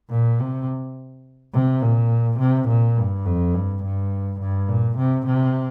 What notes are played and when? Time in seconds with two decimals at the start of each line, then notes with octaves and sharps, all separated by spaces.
0.11 A#2
0.40 C3
1.54 C3
1.82 A#2
2.39 C3
2.69 A#2
2.97 G2
3.26 F2
3.54 G2
3.83 G2
4.41 G2
4.69 A#2
4.98 C3
5.26 C3